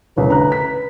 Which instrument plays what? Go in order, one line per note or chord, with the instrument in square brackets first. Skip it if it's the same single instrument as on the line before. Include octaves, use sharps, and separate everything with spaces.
[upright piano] F1 C2 C#3 [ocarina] B4
[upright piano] D3 A#5 F#6
B6